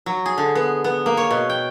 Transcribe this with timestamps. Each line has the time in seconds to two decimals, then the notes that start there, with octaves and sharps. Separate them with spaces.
0.06 F#3
0.26 G#4
0.38 D3
0.55 B3
0.84 B3
1.06 A#3
1.17 C#5
1.31 B2
1.50 G5